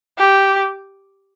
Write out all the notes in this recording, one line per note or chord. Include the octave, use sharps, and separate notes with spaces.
G4